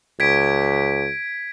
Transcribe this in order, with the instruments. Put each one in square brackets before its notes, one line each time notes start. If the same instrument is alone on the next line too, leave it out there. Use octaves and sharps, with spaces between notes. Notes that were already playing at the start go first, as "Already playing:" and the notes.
[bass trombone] C#2 [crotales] G#6 B6 D7